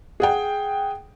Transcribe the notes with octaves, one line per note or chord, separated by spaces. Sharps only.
G#4 F#5 G5